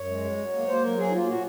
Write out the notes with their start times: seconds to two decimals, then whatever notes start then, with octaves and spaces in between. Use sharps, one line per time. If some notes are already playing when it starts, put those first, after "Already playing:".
Already playing: F#2 C#5
0.09 G#3
0.24 F#3
0.38 F#3
0.53 A#3
0.67 A#3 C5
0.83 F#3 A#4
0.97 A#3 G#4
1.08 D#4
1.12 A#3 F4
1.27 A#2 F#4